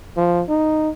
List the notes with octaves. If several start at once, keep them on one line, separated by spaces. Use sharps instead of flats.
F3
D#4